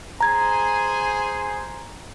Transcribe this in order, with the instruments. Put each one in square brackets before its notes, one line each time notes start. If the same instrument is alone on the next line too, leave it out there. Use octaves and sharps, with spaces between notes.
[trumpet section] G#4 C5 G#5 [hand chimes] A#5 G#6